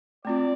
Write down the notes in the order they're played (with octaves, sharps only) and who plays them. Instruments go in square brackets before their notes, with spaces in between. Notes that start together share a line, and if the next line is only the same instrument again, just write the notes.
[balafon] A3 C4 F4 [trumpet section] D5